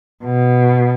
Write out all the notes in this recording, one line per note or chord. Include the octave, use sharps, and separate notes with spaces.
B2